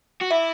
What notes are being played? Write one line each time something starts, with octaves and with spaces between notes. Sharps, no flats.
F#4
E4 E5